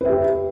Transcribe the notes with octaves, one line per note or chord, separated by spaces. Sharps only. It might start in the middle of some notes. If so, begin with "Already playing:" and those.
G4 B4 E5